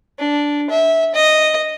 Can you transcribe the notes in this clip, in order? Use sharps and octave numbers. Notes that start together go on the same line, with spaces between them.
D4
E5
D#5